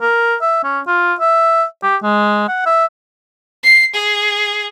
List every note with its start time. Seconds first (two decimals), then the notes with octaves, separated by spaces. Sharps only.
0.01 A#4
0.41 E5
0.64 C#4
0.87 F4
1.20 E5
1.83 G4
2.03 G#3
2.48 F#5
2.66 E5
3.63 C7
3.94 G#4